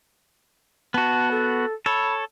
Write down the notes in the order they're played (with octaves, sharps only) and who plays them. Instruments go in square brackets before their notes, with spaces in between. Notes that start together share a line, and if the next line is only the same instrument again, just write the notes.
[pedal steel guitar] B3 F#4 [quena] A5
[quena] A4
[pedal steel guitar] A4 C#5 [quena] B5